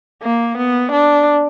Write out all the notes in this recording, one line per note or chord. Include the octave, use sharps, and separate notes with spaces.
A#3
B3
D4